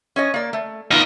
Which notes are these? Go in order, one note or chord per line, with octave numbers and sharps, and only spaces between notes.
C#4 C#5 D#5
A#3 D5
A3
B3 D#4 F4 D#5 F5